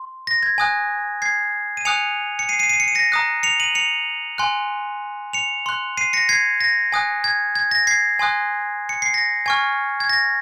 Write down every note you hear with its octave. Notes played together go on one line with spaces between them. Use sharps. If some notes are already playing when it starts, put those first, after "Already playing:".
Already playing: C6
A#6
G#6
G#5 D#6 F#6
G#6 C7
D#7
G#5 D#6 F#6 C#7 F7
C#7
C7 D#7
C7 D#7
C7 D#7
C#7
D#7
A#6 C#7
A#5 D#6 F#6
C#7 F7
D#7 F#7
C#7 F7
G#5 C6 F#6
C#7 F7
C6 F#6
C7 D#7
A#6 C#7
G#6 C7
A#6
G#5 D#6 F#6
G#6
G#6
A#6
G#6 C7
G#5 C6 D#6 F#6
C#7
C7
A#6
G#5 C#6 F6 G#6
G#6
A#6